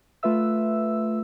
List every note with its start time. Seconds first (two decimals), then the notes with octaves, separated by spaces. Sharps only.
0.23 A3 F4 B4 E5 E6